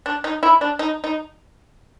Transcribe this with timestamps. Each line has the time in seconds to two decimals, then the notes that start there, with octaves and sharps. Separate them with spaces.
0.06 D4
0.24 D#4
0.43 E4
0.61 D4
0.79 D#4
1.04 D#4